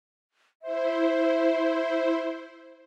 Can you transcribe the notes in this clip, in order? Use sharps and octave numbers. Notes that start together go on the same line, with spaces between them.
E4 C5 E5